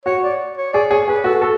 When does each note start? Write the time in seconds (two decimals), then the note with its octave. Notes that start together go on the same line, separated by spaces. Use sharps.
0.05 F#4 C#5
0.23 D5
0.57 C#5
0.73 G#4 D5
0.91 G#4 C#5
1.08 G#4 B4
1.24 F#4 A4
1.42 F#4 A4